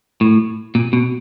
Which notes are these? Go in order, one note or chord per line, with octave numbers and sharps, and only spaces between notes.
A2
A#2
B2